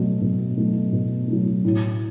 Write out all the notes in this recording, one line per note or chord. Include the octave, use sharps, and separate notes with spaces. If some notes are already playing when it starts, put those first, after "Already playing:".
Already playing: B2 F#3 A3
B2
F#3 A3
B2
F#3 A3
A2